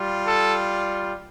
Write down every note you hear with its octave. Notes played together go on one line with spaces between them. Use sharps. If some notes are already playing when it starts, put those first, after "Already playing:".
Already playing: G3 F4
A4